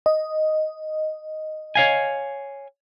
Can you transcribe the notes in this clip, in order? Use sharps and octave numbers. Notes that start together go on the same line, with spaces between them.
D#5
C#5 F5 G#5